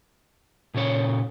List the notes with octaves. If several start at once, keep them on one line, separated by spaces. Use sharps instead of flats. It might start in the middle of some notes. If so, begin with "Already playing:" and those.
A#2 C#3 C#5